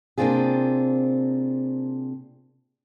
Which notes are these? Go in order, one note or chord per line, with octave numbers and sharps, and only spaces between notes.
C3 A#3 C4 D4 F4 G#4